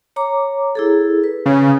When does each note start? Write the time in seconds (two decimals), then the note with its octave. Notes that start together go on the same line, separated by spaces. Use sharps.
0.16 C#5 A#5 D6
0.75 E4 G#4 A4
1.24 B4
1.46 C#3